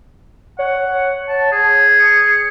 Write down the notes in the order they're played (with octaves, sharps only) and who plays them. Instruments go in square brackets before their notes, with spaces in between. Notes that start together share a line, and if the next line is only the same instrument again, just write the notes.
[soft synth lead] C#5 [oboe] F#5
[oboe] A5
G#4
[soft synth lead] C#7